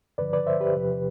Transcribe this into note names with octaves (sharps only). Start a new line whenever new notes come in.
G2 D3 F3 B4 D5
B4 D5
C5 E5
G4 B4
E2 C3 F3